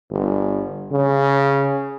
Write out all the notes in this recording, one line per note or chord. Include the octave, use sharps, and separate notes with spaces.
G1
C#3